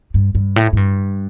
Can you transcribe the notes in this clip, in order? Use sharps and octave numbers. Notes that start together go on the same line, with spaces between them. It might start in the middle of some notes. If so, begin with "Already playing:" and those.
G2
G2
A2
A2
G2